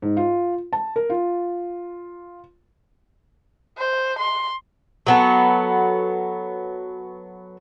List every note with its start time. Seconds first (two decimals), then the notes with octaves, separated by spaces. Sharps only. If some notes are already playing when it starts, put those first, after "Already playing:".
0.02 G#2
0.17 F4
0.73 A5
0.96 A#4
1.10 F4
3.78 C5
4.19 C6
5.06 F#3 B3 A4